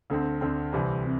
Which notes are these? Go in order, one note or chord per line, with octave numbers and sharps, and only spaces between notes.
D2 D3 C4
D2 D3 C4
C2 C3 E3 G3 C4
C3